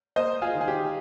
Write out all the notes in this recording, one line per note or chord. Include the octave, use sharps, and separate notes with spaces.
A#3 C5 D#5
F4 G#4
D#3
G#4
G4